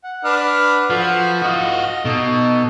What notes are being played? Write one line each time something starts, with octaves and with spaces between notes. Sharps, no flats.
F#5
D4 B4 F6
F3 F#4 A4 B4
F4 F#4 D#5
F6
B2 D#4 A4